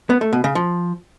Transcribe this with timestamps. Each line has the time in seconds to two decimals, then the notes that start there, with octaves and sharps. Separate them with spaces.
0.10 B3
0.21 A3
0.33 B2
0.44 C#3
0.55 F3